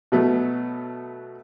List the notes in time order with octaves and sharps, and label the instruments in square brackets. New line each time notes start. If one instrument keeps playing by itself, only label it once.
[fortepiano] B2 F#3 A3 B3